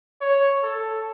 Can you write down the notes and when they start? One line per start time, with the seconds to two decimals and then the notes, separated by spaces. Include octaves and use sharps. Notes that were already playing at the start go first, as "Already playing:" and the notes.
0.21 C#5
0.63 A4